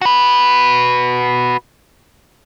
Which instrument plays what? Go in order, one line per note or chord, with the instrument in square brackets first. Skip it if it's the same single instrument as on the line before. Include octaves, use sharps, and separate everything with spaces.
[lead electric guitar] F#4 B4